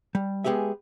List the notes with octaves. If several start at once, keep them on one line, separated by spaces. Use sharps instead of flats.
G3
G#3 B3 G4 G#4 E5